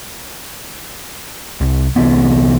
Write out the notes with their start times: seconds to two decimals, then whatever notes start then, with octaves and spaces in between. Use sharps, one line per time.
1.61 C2
1.96 C2 C3 E3 B3